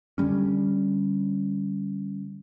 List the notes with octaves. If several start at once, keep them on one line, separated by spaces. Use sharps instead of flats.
D3 E3 G3 C#4